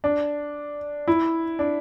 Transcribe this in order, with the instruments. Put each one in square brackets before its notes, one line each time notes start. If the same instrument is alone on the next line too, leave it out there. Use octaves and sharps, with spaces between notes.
[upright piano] D4
E4
D4